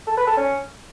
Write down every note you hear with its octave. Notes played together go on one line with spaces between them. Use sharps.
A4
B4
A4
C#4